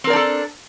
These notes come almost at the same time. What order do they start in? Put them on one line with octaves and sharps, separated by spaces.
C4 A#4 D5 D4 A4